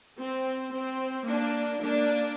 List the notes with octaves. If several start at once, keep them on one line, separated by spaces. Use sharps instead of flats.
C4
C4
A#3 D4
A#3 D4